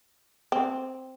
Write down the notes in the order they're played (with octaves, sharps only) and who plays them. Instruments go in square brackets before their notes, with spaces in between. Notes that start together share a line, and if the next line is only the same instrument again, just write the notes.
[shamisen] C4